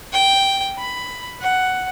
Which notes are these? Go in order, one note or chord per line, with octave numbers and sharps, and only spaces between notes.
G5
B5
F#5